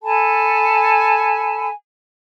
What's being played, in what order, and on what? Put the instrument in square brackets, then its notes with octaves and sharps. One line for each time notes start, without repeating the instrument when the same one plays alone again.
[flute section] A4 G#5 A5 B5